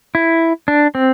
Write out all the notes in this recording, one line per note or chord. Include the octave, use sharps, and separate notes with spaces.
E4
D4
C4